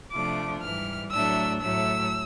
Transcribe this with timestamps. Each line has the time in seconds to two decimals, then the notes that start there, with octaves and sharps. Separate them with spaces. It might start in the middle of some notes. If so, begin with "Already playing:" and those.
0.12 C3 F3 A3 D4 D6
0.62 G#2 E3 G3 F6
1.12 A2 F#3 A3 D4 E6
1.62 A2 F#3 A3 E6